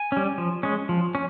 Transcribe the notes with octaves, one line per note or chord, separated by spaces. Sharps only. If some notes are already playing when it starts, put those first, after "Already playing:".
Already playing: G#5
G3 C#4
F3
G#3 C#4
F3
C#4